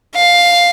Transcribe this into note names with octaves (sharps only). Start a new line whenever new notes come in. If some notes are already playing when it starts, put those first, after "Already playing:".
F5